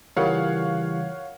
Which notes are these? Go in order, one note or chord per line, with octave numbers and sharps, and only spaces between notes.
C#3 E3 G3 F4 A#4 C#5 F5 F#5